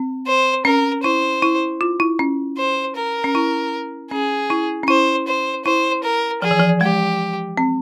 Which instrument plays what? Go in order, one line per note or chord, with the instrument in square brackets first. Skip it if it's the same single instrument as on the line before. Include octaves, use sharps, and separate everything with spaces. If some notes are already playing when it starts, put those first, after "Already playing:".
Already playing: [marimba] C4
[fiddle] C5
[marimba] C#4 [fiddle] A#4
[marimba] E4 [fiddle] C5
[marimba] E4
F4
E4
C#4
[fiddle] C5
A#4
[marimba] C#4
E4
[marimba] C#4 [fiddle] G#4
[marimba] E4
C#4
[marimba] E4 [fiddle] C5
[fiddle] C5
[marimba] E4 [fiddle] C5
[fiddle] A#4
[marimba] F3 [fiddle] G#4
[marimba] E3
F3
[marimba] G#3 [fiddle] G4
[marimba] C4